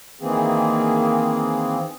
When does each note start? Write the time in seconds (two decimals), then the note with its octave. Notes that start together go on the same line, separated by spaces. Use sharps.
0.21 D#3 E3 A#3 C4 G#4